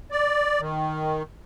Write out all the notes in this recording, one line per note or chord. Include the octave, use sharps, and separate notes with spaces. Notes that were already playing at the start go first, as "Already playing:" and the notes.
D5
D#3